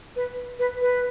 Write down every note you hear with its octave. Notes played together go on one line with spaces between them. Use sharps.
B4
B4
B4